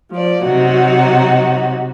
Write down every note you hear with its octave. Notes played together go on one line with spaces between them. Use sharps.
F3 D5
C3 F#3 D#4 F#4